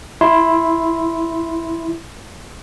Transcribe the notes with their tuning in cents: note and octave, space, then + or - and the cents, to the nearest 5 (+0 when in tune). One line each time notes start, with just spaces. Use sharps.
E4 +0 C6 +0